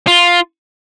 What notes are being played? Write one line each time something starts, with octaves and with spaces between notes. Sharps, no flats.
F4